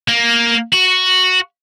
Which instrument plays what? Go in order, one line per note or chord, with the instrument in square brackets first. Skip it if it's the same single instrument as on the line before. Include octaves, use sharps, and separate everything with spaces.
[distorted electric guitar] A#3
F#4